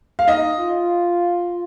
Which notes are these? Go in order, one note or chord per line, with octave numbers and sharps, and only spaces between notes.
F5
D#4 D#5
F4